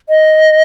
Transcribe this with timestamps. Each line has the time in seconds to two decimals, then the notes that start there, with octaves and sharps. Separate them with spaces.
0.09 D#5